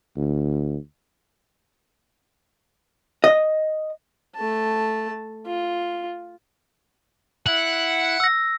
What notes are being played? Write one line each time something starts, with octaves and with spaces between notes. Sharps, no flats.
D2
D#5
A3 A5
F4
E4 F#5
E6 A#6